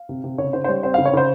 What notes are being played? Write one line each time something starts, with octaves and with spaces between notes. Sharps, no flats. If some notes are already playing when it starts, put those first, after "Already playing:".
Already playing: F5
C3
C3
C#3 C#5
C#3 C5
C5
G3 C#5
C4 C5
C#3 F5
C#5
C#3 C5